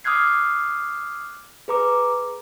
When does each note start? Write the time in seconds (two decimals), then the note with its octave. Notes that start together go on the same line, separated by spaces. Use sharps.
0.04 D6 D#6 F6 F#6 G#6 C7
1.68 G#4 B4 A#5 D6